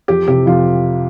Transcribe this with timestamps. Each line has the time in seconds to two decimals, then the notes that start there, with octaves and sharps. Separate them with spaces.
0.08 F2 G4
0.28 C3 G4
0.46 F2 F4